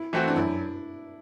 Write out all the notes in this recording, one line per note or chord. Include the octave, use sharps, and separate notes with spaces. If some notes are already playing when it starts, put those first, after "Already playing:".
Already playing: E4
E3 A3 C4 E4 F#4
D4
F#2 E4